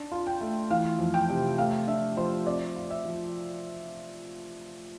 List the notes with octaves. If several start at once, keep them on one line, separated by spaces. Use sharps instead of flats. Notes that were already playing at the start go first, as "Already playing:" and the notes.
Already playing: D4
F4
G5
A3
E3 F5
F2
G5
C3
A3 F5
D4 E5
F3 C5
C4 D5
F4
E5
F3